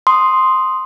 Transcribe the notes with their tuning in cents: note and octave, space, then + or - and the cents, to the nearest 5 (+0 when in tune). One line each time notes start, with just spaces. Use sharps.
C6 +0 D#6 +0